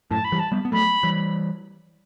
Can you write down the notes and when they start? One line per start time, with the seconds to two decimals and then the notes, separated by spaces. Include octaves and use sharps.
0.11 F#2 A2 A5
0.24 B5
0.32 E3 G3
0.39 A5
0.52 G3 B3
0.65 B3
0.72 F#3 A3 B5
1.03 E3 G3